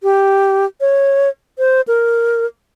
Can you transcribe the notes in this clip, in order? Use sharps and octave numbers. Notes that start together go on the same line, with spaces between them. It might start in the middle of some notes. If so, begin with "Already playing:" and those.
G4
C#5
C5
A#4